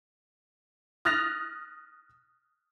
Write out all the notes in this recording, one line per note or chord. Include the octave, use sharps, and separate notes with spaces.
D#6 F6 F#6 A6 A#6 F7